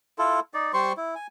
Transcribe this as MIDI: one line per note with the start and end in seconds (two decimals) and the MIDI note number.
0.18 0.40 64
0.18 0.40 65
0.18 0.40 69
0.54 0.72 63
0.54 0.72 74
0.74 0.93 55
0.74 0.93 72
0.74 0.93 84
0.74 0.93 85
0.97 1.15 64
1.15 1.27 80